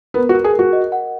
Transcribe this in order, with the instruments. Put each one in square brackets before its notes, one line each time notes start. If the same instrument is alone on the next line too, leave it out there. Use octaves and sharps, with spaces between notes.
[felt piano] B3 [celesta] A#4
[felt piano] F#4
[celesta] A#4
[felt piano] G#4
[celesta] A#4
[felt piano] F#4
[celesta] D#5
F#5